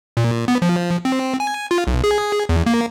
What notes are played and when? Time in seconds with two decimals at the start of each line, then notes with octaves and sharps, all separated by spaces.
0.17 A#2
0.48 B3
0.62 F3
1.05 C4
1.40 G#5
1.71 F4
1.87 B1
2.04 G#4
2.49 E2
2.66 A#3